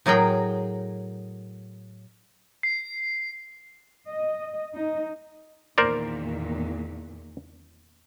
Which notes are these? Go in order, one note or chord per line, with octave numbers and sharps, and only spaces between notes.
A2 F#3 G#4 A#4 G5
C7
D#5
D#4
E2 A#2 D#3 A#4 C5 D5